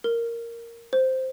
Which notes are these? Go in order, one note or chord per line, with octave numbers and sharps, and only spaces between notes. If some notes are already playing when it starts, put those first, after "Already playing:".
A#4
C5